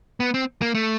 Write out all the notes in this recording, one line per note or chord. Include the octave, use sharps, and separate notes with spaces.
B3
C4
A#3
A3